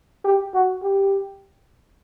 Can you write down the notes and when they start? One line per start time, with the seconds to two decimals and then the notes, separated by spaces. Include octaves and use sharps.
0.25 G4
0.53 F#4
0.83 G4